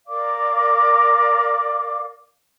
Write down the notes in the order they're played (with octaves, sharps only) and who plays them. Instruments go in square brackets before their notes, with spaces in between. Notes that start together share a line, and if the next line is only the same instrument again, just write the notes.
[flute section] A#4 D5 F5 D6